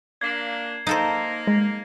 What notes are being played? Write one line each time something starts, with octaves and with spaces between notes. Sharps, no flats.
A#3 D4 G#6 C7
A#3 D#4 A4 C5
G#3